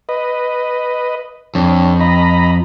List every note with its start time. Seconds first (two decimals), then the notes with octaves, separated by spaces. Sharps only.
0.09 B4 D#5
1.55 F2 D4 C#5
2.00 D#5 A#5 B5